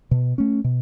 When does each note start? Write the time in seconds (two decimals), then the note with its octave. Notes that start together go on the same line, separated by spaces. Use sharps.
0.11 B2
0.38 A3 C#4
0.64 B2